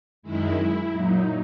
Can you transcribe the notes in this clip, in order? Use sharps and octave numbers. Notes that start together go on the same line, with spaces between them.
F#2 D#3 G#3 E4
E4
A#2 F#3 D#4